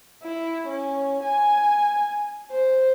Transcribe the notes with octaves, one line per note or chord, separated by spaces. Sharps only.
E4
C#4
G#5
C5